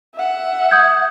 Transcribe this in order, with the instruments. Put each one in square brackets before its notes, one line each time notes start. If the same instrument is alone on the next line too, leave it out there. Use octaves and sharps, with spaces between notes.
[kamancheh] E5 F#5
[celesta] D#6 G6 G#6